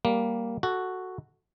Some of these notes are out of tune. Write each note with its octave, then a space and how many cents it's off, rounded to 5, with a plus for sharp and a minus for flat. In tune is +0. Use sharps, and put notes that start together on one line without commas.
G3 +0 A#3 +0
F#4 +0 A4 +0